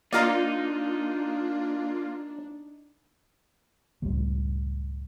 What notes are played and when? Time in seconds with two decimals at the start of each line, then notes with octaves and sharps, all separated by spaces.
0.13 A#3 D4 D#4 F4 D5 F5 A#5
4.02 C#2 F#2 A2 G3